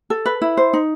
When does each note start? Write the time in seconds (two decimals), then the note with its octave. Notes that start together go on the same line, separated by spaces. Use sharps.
0.10 A4
0.26 B4
0.42 E4
0.57 C5
0.73 D#4